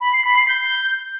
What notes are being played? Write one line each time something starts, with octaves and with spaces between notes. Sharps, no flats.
B5
C7
B5
C7
G6